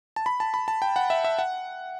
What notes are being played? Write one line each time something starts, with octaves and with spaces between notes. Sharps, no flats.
A5
B5
A5
B5
A5
G5
F#5
E5
E5
F#5